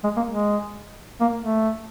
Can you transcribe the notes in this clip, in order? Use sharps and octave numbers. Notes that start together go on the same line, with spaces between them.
G#3
A#3
G#3
A#3
A3